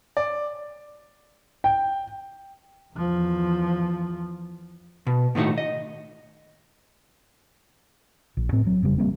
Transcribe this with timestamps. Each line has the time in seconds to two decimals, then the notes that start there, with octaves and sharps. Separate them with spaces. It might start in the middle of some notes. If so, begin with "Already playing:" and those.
0.17 D5
1.64 G5
2.94 E2 F3
5.07 B2
5.35 A2 D#3 A3 D#4 F#4
5.58 D#5
8.37 A#1
8.52 A2 C4
8.67 F#3
8.82 F1 C#3 G3
8.98 G3 A#3 C4